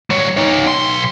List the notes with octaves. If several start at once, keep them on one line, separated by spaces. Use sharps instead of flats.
G3 C#5
D#4 C#5
B1 C6